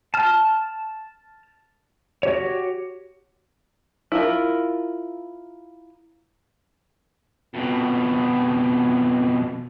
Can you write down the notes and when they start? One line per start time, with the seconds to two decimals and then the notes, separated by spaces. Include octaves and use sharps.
0.14 A5 F6
2.23 F#4 G4 C#5
4.12 E4 F4 A#4
7.54 F2 B2